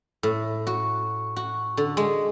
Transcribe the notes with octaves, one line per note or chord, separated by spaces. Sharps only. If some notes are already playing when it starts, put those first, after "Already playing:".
A2
F#4
F#4
D3
G#3